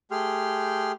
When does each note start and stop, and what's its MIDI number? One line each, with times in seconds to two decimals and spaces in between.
0.11 0.92 57
0.11 0.92 67
0.11 0.92 68
0.11 0.92 79
0.11 0.92 84
0.11 0.92 89